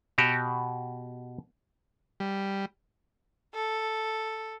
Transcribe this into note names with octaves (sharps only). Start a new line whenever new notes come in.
B2 F#4 G4
G3
A4